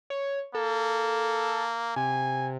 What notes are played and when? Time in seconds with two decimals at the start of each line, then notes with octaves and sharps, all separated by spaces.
0.10 C#5
0.55 A#3 A4
1.96 C3 G#5